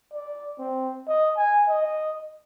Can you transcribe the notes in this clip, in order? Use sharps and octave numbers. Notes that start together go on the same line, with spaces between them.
D5
C4
D#5
G#5
D#5